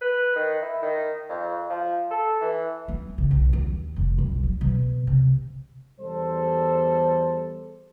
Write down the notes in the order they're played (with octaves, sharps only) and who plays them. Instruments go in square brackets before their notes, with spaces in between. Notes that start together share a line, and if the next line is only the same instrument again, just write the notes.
[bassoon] B4
D#3
E4
D#3
F2
F3
A4
E3
[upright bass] B3
C#3
B1
D#2
F1
B1
F#3
B2
C3
[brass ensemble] E2 G3 A4 C5